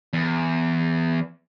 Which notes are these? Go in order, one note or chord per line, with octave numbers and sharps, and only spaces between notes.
E2